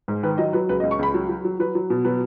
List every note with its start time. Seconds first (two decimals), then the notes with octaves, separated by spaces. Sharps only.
0.08 G#2
0.23 D#3 B4
0.38 F#3 D#5
0.53 F#3 B4
0.69 C#2 B4
0.80 D#5
0.83 C#2
0.91 C#6
0.99 C#2 B5
1.14 F#3
1.29 F#3
1.45 F#3
1.60 F#3 B4
1.75 F#3
1.90 B2
2.05 F#3 B4